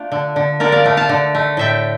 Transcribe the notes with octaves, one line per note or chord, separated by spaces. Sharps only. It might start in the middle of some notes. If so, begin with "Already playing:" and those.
Already playing: A3 D4 F4
D3
D3
D3 A#4 D5
D5 F5
A3 D5 F5
F5 A5
D3
A3
A2 E5 G5